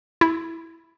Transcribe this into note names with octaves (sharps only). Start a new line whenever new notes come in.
E4